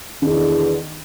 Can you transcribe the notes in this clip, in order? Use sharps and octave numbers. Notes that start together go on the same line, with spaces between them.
E2 B2 D3 D#3